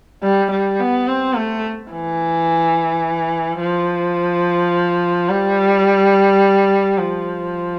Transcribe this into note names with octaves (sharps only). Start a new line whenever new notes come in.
G3
G3
B3
C4
A3
E3
F3
G3
F3